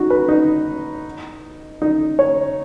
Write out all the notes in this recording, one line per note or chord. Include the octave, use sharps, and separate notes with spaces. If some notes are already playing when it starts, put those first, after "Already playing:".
Already playing: D#4 F#4
B4
D#4
D#4
C#5